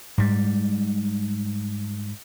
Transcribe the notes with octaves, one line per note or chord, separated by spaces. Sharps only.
G#2 G3